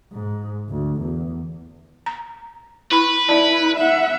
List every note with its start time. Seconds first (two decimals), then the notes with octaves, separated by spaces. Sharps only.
0.13 G#2
0.69 D2
1.01 E2
2.06 A#5
2.92 E4 B4 B5
3.29 E4 D5 A5
3.76 E5 F#5